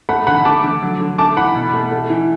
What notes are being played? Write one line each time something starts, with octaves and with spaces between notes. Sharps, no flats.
A3 F#5 B5
D3 F#5 B5
A3 A5 D6
D3
F#3
D3
A3 A5 D6
E3 F#5 B5
B2
A3
A3
E3